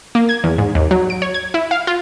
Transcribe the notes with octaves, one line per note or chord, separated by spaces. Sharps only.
A#3
G#6
E2
G#2
D#2
F#3
D7
C#5
G#6
E4
F5
F4